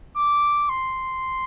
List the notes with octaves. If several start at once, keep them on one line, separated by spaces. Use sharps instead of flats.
D6
C6